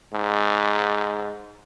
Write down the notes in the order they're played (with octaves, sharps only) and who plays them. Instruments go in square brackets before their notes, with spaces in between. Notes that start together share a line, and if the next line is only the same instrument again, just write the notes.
[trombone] G#2